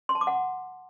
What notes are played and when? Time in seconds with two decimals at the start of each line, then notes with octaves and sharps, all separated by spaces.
0.09 C6
0.15 A5
0.21 D6
0.27 F#5